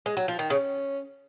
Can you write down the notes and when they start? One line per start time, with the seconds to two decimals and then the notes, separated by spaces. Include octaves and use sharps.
0.06 G#3
0.17 F#3
0.28 F3
0.39 D#3
0.50 C#3 C#4